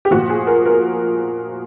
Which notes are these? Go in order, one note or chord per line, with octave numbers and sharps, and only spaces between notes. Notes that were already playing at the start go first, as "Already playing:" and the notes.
G4
A#2 F3 F#4
G#4
A#4
A#4